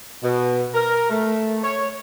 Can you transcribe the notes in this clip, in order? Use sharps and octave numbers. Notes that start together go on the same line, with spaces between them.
B2
A#4
A3
C#5